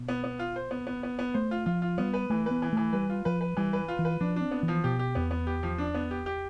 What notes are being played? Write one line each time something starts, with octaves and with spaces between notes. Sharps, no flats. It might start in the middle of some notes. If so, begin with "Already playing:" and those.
Already playing: B2
B3
B3
F4
C5
B3
B3
B3
B3
A3 C5
F4
F3 F4
F4
G3 B3
B4
E3 A3
B3 B4
E3
E3 A3
G3 B4
F4
F3 B4
B4
E3 G3
B4
F4
E3
B4
F3 D4
C4 D4
B3
E3
F3
B2 G4
G4
E2 B3
B3
G4
F3
D4
B3
G4
G4